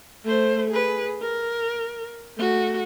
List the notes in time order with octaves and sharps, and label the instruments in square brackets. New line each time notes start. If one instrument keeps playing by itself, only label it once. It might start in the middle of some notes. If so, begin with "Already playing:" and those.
[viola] A3 C5
G#4 B4
A#4
A3 F#4